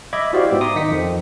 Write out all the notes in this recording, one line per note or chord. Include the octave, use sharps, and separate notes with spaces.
D#5 E5 B5 D6 G#6
E4 F#4 G4 C5 D5 F5
G#2 B3 E5 G5
A#5 C6 D6 D#6
D#3 D#4 B6 C#7
F2 C4